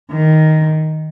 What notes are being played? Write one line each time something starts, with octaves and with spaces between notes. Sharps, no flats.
D#3